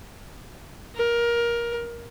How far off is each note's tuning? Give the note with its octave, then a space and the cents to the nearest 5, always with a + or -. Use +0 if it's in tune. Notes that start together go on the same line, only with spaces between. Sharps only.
A#4 +20